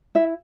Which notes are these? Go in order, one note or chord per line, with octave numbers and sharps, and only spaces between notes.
E4 E5